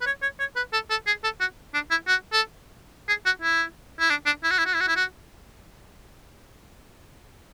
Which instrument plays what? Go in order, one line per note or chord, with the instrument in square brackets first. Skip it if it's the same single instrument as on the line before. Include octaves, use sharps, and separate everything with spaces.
[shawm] B4
C#5
C#5
C#5
B4
A4
A4
G#4
A4
F#4
D4
E4
F#4
A4
G#4
F#4
E4
E4
D4
D4
E4
F#4
E4
F#4
E4
F#4
E4
F#4